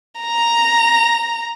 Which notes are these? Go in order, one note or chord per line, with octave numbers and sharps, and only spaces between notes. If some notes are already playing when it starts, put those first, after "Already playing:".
A#5